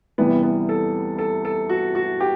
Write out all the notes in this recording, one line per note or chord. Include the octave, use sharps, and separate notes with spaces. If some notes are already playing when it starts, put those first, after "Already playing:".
E2 C3 E3 G3 B3
B3
A4
A4
A4
F#4
F#4
G4